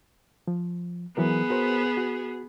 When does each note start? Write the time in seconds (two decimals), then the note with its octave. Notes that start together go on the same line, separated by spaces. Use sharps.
0.48 F3
1.17 E3 F#3 B3 G#4 A#4
1.50 F#4 A#4 C5
1.97 F#4